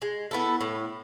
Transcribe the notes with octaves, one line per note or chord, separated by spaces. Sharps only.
G#3
B3 E4 A4
A2